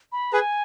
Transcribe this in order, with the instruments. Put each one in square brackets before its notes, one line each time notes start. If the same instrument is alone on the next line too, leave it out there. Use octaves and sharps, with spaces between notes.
[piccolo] B5
[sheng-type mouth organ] G#4 B4 [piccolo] G#5